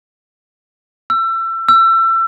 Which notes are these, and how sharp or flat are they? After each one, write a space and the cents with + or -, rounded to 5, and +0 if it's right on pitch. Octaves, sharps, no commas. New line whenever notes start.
E6 +30
E6 +30